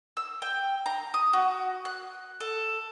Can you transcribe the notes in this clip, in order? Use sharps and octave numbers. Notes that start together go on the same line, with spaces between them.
E6
G5
A#5
D#6
F#4
F#6
A4